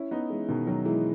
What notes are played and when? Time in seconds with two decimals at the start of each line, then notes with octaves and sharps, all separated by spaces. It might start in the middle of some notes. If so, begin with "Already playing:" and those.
Already playing: C#4 E4
0.11 B3 D#4
0.30 E3 G#3
0.48 B2 D#3
0.67 D#3 F#3
0.85 E3 G#3